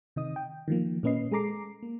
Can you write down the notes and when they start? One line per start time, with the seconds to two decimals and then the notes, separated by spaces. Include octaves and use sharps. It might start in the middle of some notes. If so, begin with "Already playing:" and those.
0.16 C3 D#3 D#5 D#6
0.36 G5
0.68 D#3 F3 A#3
1.03 A#2 A#3 C#4 B4 D#5 C7
1.31 G#3 G#4 A4 A#5 D6 C7
1.83 A#3